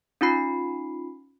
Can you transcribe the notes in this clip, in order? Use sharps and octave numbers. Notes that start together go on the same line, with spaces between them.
C#4 D#4 F4 B5 C7